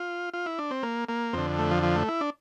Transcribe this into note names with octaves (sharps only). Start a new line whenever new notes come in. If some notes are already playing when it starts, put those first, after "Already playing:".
Already playing: F4
F4
E4
D4
C4
A#3
A#3
F2 D3 C4
A3
F3
F3
A3
E4
D4